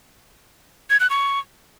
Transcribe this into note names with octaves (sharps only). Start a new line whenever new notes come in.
G#6
F#6
C#6